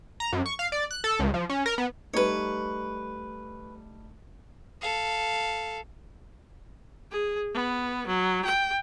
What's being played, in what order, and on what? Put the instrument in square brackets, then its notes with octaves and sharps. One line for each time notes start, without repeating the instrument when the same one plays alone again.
[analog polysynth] A#5
F#2
C#6
F5
D5
F#6
A4
C#2
F3
C#4
A#4
B3
[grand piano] G3 A3 D#4 [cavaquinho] B4 C#5
[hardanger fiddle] A4 F5
[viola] G#4
B3
F#3
G5